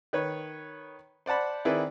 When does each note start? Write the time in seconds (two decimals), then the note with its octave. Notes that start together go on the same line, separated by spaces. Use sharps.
0.13 D#3 B4 C#5
1.26 C5 D5 F#5 A5 B5
1.65 D#3 C4 E4 G#4 B4 D5